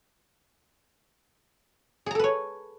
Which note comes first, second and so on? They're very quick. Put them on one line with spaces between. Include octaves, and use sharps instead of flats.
G#4 A#5 A4 B4 C#5